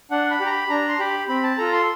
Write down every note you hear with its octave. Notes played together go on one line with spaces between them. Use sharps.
D4 F#5
B5
G4
A#5
B5
D4 A#5
C6
G4 B5
C4 B5
A5
F4 A4 A#5
C6